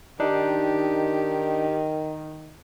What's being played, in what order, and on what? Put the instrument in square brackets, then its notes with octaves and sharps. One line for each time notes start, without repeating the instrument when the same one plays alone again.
[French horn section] D#3 [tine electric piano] D4 D#4 [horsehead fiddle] G4